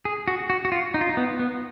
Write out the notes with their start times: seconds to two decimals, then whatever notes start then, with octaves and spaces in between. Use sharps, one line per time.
0.05 G#4
0.28 F#4
0.50 F#4
0.65 F#4
0.72 F4
0.94 D#4
1.01 F4
1.09 D#4
1.17 B3
1.39 B3